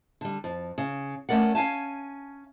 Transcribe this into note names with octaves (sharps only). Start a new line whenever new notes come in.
D3 G3
F2
C#3
A3 C#4 A#4 D5 F#5
C#4 F5 G#5 A5